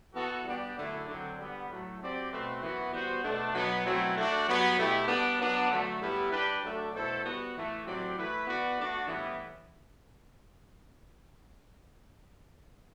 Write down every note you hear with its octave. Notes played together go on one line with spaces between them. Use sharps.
E3 B3 F#4 A4
G3 B3 D4 G4 D5
F#2 D3 A3 E4
D3 F#3 C4
D3 G3 B3
A2 F#3 A3
F#3 C4 G4 D5
B2 A3 C4 F#4 B4
F#2 E3 B3 F#4
G3 B3 F#4 C5
B2 A3 D4
B2 F#3 B3
B2 F#3 A3 C4 E4
A3 D4 F#4
G2 F#3 B3 F#4
B2 A3 E4 G4
G3 B3 D4
F#3 B3 D4
D3 F#3 A3
A2 G3 B3 E4 B4
G3 D4 G4 B4
F#3 A3 D4 A4
B2 A3 E4 A4 C5
G3 B3 F#4
A2 E3 A3
A2 F#3 C4 G4 D5
E3 A3 E4 B4
E3 B3 F#4 B4 D5
A3 D4 F#4
A2 E3 G3 B3 E4